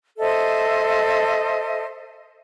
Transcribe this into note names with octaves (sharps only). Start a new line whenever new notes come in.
A4 C5 D#5 E5